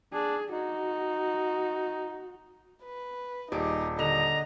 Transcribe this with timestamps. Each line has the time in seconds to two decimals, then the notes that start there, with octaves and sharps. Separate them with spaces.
0.13 D4 G#4
0.52 D#4 F#4
2.83 B4
3.52 D#1 G3 D#4 G#4 D6
3.99 D3 D#5 A#5